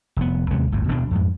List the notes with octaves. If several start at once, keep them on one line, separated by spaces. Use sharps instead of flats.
F1 B3
D#2 C3 G#3 B3
G1 D2 A2
D#1 B2 B3 D4
F2 G#2